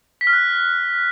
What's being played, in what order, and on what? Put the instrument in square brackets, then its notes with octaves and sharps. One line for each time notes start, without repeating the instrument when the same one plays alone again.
[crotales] B6
F6
F#6